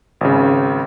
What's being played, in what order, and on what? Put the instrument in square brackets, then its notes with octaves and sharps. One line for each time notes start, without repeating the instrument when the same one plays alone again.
[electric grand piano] G#1 C#3